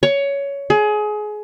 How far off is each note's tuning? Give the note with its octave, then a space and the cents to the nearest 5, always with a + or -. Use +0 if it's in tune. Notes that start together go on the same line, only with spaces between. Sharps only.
C#5 +15
G#4 +25